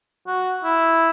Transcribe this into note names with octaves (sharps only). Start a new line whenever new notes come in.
F#4
E4